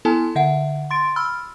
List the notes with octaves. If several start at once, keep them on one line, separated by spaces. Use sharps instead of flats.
B3 E4 A4 G#5 A5
D3 E5 F#5
C6 A6 D7
B5 E6 F6